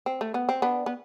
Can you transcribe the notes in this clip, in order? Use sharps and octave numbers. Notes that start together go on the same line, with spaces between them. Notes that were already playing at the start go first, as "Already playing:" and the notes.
C4
A3
B3
C4
B3 D4
B3